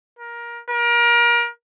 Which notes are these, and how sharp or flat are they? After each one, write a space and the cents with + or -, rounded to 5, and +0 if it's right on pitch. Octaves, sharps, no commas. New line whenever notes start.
A#4 +20
A#4 +30